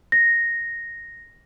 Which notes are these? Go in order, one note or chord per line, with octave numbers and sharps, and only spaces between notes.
A#6